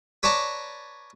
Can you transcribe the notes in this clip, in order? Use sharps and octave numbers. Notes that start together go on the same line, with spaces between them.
B4 C#5 D5 A5 A#5